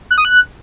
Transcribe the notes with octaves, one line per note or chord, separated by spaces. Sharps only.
F#6
D#6
F#6